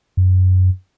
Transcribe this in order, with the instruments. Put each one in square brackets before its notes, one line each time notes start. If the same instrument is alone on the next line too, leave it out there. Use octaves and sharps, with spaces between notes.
[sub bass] F#2